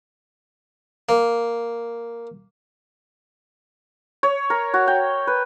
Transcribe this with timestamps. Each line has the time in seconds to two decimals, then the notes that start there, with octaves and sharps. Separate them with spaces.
1.09 A#3
4.23 C#5
4.50 A#4
4.74 F#4
4.88 G5
5.27 B4